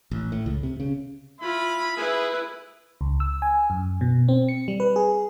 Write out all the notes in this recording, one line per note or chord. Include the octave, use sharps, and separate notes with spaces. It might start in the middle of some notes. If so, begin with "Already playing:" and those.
A1
A2
C#2
C3
C#3
E4 F4 B5
E4 G#4 B4
C#2
E6
G#5
F#2
B2
C4
C#7
G3
B4
G#4